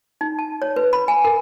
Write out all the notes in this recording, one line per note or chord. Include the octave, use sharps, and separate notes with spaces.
D#4
A5
C#5
B4
B5
G#5
A#4